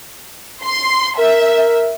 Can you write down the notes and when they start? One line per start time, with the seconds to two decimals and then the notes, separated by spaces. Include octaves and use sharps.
0.64 C6
1.19 A#4 E5